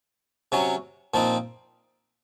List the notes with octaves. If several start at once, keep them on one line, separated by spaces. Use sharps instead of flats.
C3 F#3 C#4
A#2 F3 C4 D#4